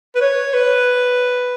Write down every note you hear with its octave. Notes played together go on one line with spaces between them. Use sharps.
B4
C#5
B4